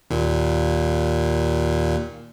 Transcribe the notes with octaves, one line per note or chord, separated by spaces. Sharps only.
D#2 A#2